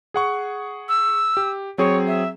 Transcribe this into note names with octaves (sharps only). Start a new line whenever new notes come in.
G#4 F#5 C#6
E6
G4
F#3 C4 G#4 C#5
E5